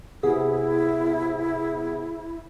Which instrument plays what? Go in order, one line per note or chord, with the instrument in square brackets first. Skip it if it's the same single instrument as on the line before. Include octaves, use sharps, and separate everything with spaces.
[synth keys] C3 B3 G#4 [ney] E4